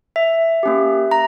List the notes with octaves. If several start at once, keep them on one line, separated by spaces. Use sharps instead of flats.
E5
A#3 C#4 G4
A#5